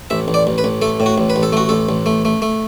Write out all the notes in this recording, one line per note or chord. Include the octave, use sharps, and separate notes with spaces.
A1 E5
A1
D5
A1
B4
A1
A3 A4
A2
F#4
A1
B4
A1
A4
A3 F#4
A1 A4
A1
A3
A3
A3